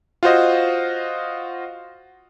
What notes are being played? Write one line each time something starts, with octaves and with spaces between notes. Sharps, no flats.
F4 F#4 C5 D#5